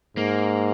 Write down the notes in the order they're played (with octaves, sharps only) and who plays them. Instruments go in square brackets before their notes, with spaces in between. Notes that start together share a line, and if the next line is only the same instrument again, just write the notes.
[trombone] G#2 [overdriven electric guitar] A#3